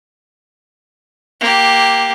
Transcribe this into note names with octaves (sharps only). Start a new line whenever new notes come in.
A#3 G4